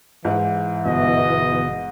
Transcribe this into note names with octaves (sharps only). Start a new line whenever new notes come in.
G#2 E3
G1 B2 D#5